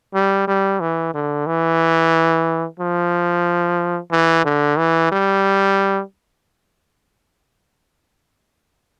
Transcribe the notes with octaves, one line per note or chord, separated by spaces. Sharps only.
G3
G3
E3
D3
E3
F3
E3
D3
E3
G3